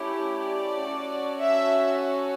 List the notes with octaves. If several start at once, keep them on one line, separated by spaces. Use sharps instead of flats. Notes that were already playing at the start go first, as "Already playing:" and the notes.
Already playing: A3 C#4 E4 G4
D5
C#4 F#4 A4
E5